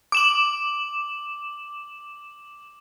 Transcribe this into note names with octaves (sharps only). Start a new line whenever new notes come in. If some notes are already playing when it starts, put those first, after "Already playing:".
D6 E7 F#7